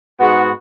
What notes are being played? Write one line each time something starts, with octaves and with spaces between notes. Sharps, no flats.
G#2 G#3 B3 F#4